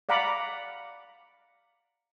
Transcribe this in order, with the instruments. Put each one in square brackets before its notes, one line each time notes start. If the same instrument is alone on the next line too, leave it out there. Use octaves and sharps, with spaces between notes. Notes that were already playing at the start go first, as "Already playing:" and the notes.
[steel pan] D5 F5 F#5 A#5 B5 D6